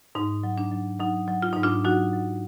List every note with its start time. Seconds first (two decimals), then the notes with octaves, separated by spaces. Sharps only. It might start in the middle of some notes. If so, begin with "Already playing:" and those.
0.15 G#2 D#4
0.43 F#3
0.58 D4
0.72 F#3
1.00 F#3 D#4
1.28 F#3
1.42 F4
1.53 G#2 D#4
1.63 D4 F4
1.85 F#3 D#4 F#4
2.13 F#3